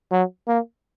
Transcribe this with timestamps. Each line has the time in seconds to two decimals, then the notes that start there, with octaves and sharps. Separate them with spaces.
0.12 F#3
0.48 A#3